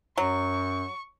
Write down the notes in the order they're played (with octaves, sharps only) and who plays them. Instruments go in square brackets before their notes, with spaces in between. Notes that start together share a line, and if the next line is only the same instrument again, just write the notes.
[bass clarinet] F#2 [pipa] F#3 [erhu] C#6